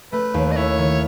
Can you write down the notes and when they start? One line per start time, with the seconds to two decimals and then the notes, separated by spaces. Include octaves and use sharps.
0.12 A3 B4
0.34 D#2
0.51 D#5
0.56 E4 C#5
0.78 D#3